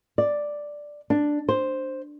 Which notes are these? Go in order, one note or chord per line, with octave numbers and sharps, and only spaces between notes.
D5
D4
C5